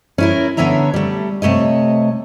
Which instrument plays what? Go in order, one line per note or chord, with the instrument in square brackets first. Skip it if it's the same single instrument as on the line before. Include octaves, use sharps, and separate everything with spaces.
[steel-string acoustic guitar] C#4 E4 A#4
D3 B3 C#5 E5 A#5
G3 A3
C3 A3 C#5 D#5